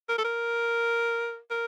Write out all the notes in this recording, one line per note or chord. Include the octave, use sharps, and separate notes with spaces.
A#4
A4
A#4
A#4